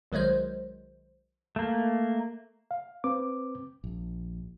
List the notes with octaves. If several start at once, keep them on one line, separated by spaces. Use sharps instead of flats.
B1 D#3 F#3 G#3 C5
A3 A#3
F5
C4 B4 D6
A#1